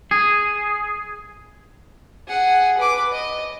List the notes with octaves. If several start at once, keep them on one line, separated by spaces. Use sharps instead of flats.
G#4
G#4 F#5
B4 D6
D#5